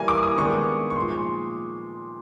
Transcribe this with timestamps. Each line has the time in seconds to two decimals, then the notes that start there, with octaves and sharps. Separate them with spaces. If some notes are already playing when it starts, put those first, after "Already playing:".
Already playing: E3 G3 A#3 G#5
0.08 D6
0.23 D#6
0.37 D#3 G#3 B3 D4 C#6
0.90 C#6
0.96 A#2 F3 G#3 C6